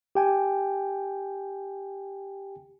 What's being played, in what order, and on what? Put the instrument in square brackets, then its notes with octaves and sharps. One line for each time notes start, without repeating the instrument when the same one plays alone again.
[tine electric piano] G4 G5 G#5